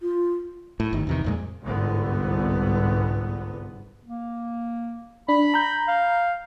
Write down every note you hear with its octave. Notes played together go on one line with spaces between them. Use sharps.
F4
A2
G1 D#3
E2 C3 D#3
F2 A#2 G#3
G1 C2 G#2 D3 B3
A#3
D4 B5
A#5 G6
F5